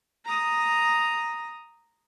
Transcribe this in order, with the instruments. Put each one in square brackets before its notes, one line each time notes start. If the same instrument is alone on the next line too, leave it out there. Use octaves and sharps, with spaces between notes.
[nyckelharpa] A#5 D#6